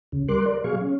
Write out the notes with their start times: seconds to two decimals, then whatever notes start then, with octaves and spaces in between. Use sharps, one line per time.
0.12 D2 C#3
0.28 G3 A#4 C6 D6 F#6
0.46 A#4 D5
0.64 B2 F#3 G#4 F5 C#6
0.81 C#4